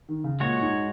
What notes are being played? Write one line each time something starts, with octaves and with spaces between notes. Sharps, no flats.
D#3
C#3
A#2 G#3 F#4 C#5
G#2